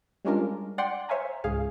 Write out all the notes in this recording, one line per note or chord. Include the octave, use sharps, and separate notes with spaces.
G3 G#3 C#4 D4 F4 A#4
D5 F#5 G5 C6
C5 C#5 E5 F5 G#5 A#5
C#2 G#2 G#4 F5